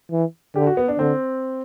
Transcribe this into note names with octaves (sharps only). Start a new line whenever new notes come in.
E3
D3 G4
F#4
B3
D4
D3 C4